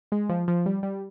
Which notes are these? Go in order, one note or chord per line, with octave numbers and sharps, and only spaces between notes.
G#3
F3
F3
G3
G3